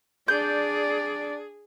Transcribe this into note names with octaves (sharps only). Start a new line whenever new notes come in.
D4 G#4 D5 G6